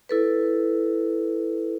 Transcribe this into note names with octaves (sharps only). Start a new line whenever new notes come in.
E4 A4 B4